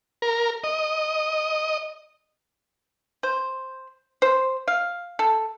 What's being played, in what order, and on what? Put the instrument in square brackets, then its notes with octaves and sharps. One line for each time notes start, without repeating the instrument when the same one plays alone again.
[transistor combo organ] A#4
D#5
[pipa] C5
C5
F5
A4